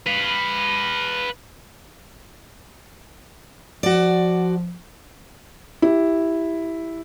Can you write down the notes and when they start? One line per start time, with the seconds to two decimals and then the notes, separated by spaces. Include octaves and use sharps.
0.07 B4 F5
3.83 F3 F#4 D5
5.82 E4 G4